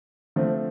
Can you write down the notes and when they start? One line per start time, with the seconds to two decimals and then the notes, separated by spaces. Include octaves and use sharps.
0.36 D3 F3 A3 C4